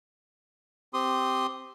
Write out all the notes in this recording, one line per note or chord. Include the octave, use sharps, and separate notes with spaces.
C4 G4 C6 D#6